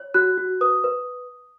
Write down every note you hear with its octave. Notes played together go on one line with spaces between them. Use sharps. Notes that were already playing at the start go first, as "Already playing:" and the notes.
Already playing: C#5
F#4 F#6
F#4
B4 D#6
B4